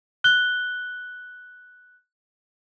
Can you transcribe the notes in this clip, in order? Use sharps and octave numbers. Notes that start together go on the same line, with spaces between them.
F#6 G7